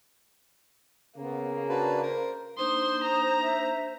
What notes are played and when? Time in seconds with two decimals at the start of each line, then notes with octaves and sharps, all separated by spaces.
1.17 C#3 A#3 B3
1.69 D4 F#4 B4 A5
2.03 A#4 C5
2.58 A#3 D4 D#4 C5 C6 D#6
3.03 A#5
3.42 E5